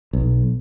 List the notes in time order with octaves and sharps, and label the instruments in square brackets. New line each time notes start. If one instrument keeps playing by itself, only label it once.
[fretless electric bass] B1